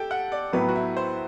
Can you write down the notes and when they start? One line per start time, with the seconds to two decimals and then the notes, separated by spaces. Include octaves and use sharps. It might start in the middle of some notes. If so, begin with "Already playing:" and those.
Already playing: G4 A4 G5
0.11 F#5
0.32 D5
0.53 A2 F#3 B3 B4
0.69 F#4
0.75 E4
0.97 C5